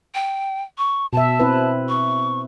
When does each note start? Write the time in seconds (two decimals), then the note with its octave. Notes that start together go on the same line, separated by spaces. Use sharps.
0.15 G5
0.78 C#6
1.13 B2 E5 A5
1.40 C4 E4 B4
1.89 C#6